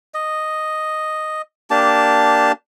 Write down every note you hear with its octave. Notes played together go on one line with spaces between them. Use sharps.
D#5
A#3 D4 G4 A5